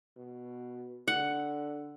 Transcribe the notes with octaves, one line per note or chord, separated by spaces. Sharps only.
B2
D3 F#5